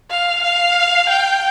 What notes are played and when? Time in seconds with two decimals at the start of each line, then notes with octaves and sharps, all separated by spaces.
0.11 F5
0.43 F5
1.09 G5